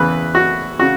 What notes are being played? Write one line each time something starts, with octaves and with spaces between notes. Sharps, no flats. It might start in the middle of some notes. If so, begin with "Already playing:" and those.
Already playing: E2 C#3 E3 B4
F#4
C#3 F#4